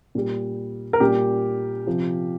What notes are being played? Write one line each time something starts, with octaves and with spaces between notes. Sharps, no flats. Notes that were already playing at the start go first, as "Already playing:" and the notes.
A#2 G3
A#4
A#2 G3 G4
C3 F3